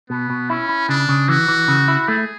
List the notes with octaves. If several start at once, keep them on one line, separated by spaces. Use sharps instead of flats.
B2 B3
B2
C#4 E4
E4
C#3 D4
C#3
E3 F#4
E3
C#3
E4
A3 G#4